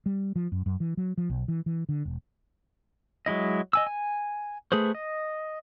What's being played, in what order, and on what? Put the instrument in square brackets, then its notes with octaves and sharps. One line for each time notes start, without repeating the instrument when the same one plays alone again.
[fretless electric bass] G3
F3
F#2
F#2
E3
F#3
F3
B1
E3
E3
D3
E1
[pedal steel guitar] F#3 G#3 E4 D#5
D#5 G#5 E6
G#5
A3 G#4 B4 C5
D#5